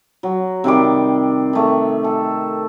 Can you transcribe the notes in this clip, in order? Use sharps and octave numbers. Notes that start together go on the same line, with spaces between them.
F#3
C3 D#3 G3 D6
D#3 A3
A4